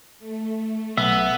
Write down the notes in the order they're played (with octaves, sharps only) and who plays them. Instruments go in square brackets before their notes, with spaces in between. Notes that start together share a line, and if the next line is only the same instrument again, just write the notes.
[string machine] A3
[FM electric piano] B1 [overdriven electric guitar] B3 [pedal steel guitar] E5